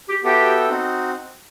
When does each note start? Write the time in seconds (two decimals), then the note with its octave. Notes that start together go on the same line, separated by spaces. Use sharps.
0.08 G4
0.24 B3 F#4 G4 A4 E5 G5
0.69 C4 D#4 F#4